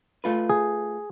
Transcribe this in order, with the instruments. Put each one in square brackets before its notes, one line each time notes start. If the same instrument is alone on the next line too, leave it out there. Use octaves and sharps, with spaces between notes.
[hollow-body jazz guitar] A3 F4 B4
[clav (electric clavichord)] G#4